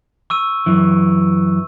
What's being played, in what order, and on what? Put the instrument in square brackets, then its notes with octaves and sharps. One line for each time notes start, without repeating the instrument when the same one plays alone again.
[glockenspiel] C#6 E6 D#7
[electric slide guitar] F#2 E3